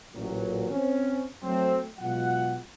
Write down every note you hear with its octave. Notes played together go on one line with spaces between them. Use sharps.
A1 A#2 F#3
C4 C#4
F#3 A3 C4
B2 F#3 G#3 F4 F#5